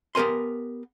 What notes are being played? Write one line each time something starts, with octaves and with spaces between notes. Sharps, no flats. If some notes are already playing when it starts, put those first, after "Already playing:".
B3 G4 A#4 G#5 C6